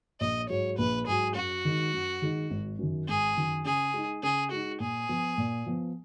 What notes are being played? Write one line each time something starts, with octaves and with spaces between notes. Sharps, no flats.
A#1 D#5
G#2 F#3 C#5
A#1 B4
G#2 F#3 G#4
F#2 F#4
D#3 G#3 D#4
F#2
D#3 G#3 D#4
G#1
F#2 D#3
G#1 G#4
F#2 D#3
C#3 G#4
G#3 D#4
C#3 G#4
G#3 D#4 F#4
A#2 G#4
F3 B3
A#2
F3 B3